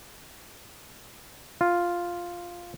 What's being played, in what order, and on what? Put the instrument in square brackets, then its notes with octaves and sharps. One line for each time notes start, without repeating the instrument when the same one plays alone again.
[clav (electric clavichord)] F4